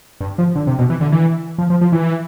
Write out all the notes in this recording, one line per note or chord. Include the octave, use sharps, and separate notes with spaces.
G2
F3
D3
C3
B2
E3
D3
E3
F3
F3
F3
E3